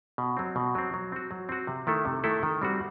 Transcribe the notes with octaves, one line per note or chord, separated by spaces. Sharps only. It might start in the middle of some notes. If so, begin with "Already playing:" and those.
B2
F#3 C4
B2
F#3 C4
F#3
C4 F#4
F#3
C4 F#4
C3
D#3 A3 E4 A4
C3
D#3 A3 E4 A4
D#3
G3 C4 F#4